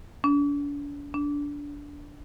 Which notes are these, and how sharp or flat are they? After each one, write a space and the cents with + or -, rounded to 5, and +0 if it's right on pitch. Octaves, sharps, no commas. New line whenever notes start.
D4 -40
D4 -20